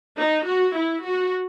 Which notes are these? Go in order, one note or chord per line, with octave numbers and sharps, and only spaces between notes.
D#4
F#4
E4
F#4